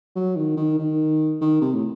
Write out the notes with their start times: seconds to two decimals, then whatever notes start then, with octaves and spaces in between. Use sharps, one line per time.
0.15 F#3
0.36 D#3
0.57 D#3
0.79 D#3
1.41 D#3
1.61 C3
1.74 A2